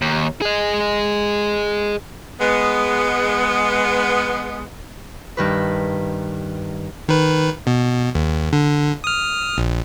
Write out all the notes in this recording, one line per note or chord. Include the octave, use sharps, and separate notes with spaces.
D#2
G#4 D#5
G#3 B3
G2 D#3 B4
D#3 B4
B2
D#2
D3
D#6 F6
A#1